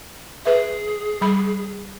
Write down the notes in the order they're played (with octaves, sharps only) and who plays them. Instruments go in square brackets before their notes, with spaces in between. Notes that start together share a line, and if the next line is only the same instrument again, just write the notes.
[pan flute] G#4 [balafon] B4 E5
[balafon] G3 B5